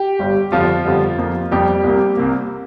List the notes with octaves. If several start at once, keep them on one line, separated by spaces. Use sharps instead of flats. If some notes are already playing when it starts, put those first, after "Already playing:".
Already playing: G4
G1 G2 G3
G1 F2 D3 F3 G3 F4
G1 F2 D3 G3
F2 F3 A#3
F2 F3 G3 A#3 G4
C2 C3 A#3
C2 C3 A#3